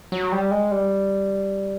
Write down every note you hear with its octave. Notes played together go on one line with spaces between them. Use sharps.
F#3
G3
G#3
G3